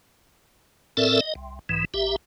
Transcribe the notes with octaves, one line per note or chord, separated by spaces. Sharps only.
A2 C4 A4 A#4 D5 E5
D#5
C2
B1 G#2 E3
A#1 G4 E5